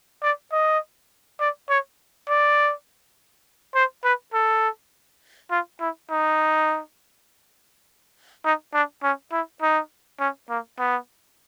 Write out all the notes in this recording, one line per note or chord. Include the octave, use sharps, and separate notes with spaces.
D5
D#5
D5
C#5
D5
C5
B4
A4
F4
E4
D#4
D#4
D4
C#4
E4
D#4
C#4
A#3
B3